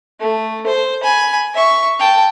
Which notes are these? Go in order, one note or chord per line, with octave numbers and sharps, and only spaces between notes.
A3
C5
G#5 B5
E5 C#6
G5 A5